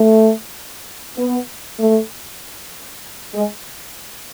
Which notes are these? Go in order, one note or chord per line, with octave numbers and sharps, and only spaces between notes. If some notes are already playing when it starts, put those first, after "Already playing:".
Already playing: A3
B3
A3
G#3